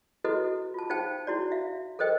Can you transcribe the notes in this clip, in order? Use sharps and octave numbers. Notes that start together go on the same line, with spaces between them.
E4 F#4 A4 B4 D#5
F4 A5
D#4 C5 F5 G5 A5
E4 F#4 D5
E5 F5
A4 A#4 C5 D#5 G5